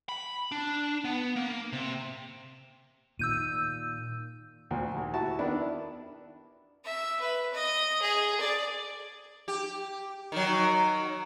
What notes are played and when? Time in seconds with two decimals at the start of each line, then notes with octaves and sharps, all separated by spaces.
0.09 B5
0.52 D4
1.04 B3
1.36 A#3
1.73 C3
3.19 A#2 D#3 E6 G6 D#7
4.71 D2 A#2 F3
4.96 D#2
5.14 E4 F#4 A5
5.39 D#3 B3 D4 E4
6.85 E5
7.20 B4
7.54 D#5
8.02 G#4
8.40 D5
9.48 G4
10.32 D#3 F#3